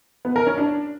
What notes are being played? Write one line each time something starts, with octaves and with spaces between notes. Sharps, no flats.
B3
A#4
C#4
D4